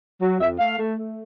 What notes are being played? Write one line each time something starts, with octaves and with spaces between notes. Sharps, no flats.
F#3
F2 E5
A3 F5
A3
A3